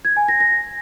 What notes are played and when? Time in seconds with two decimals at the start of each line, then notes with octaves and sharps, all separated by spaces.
0.05 G#6
0.17 G#5
0.28 A#6
0.40 A#6